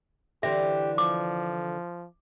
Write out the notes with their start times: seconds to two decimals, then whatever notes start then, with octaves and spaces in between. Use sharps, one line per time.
0.43 D3 E3 C4 G4 E5
0.98 F3 D6